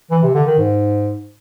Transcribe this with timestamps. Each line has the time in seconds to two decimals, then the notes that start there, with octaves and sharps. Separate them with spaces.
0.11 E3
0.23 C3
0.35 D3
0.46 D#3
0.58 G#2